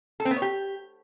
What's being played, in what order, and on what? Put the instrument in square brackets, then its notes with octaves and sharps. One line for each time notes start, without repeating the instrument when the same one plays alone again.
[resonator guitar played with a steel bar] A4
C4
B3
C#5
G4